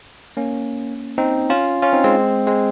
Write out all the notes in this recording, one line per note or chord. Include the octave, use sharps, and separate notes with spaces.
A#3 C#4
C4 D#4
C#4 F4
C#4 F4
C4 D#4
G#3 C4
G#3 C4